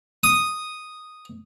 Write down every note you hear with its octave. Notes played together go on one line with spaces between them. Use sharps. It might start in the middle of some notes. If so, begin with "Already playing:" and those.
D#6